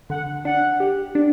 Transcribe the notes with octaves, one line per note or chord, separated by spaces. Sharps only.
D3 F#5
D4 F#5
G4
D4